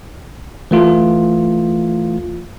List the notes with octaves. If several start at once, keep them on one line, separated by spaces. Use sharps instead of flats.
E3 A3 F4